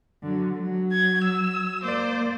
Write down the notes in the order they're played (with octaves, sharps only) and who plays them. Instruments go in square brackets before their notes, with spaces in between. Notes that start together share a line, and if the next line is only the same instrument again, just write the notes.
[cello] D3 F#3
F#3
[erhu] G#6
E6
[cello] A#3 D5 [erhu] C5